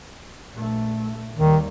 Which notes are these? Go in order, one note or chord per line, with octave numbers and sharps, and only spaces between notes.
A#1 A3
D#2 D#3 G3